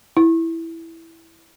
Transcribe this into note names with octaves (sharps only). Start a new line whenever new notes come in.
E4